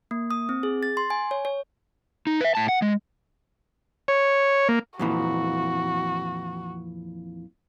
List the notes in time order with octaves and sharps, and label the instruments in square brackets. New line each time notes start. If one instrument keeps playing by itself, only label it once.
[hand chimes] A#3
D#6
C4
G#4
A6
C6
G#5
C#5
C#5
[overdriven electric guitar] D#4
B4 E5
A2 A5
F#5
G#3
[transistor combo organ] C#5
A#3
[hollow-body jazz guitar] F2 A#2 E3 [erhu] F#4